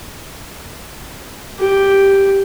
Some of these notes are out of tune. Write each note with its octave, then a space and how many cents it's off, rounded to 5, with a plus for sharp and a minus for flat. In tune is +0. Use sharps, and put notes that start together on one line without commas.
G4 +0